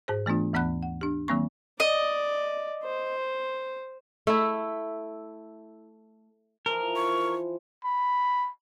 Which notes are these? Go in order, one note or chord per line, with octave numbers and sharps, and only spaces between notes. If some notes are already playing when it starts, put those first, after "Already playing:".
G#2 G#4 C5
E3 A3 B3 D4 F4
D#2 E3 B3 F#5 B5 F#6
F#5
D4 G4
D#3 F#3 A#3 C4 C#6
D5 D#5
C5
A3 E4
E3 F3 A#4
C#6
B5